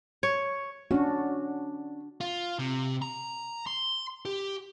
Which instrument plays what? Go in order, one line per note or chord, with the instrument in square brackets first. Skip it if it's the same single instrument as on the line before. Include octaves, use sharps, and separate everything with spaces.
[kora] C#5
[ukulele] C#4 [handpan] D4 F#4
[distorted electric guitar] F4
C3
A#5
C6
G4